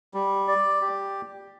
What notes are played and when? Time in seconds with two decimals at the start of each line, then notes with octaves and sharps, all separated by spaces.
0.14 G3
0.48 D5
0.82 G4